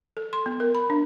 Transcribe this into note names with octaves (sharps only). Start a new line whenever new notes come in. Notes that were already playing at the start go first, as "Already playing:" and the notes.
A4
C6
B3
A#4
B5
D4